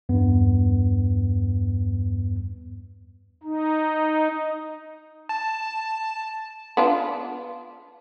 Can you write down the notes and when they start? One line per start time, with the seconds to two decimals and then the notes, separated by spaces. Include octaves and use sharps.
0.09 E2 G2 B3
3.43 D#4
5.29 A5
6.77 B3 D4 F4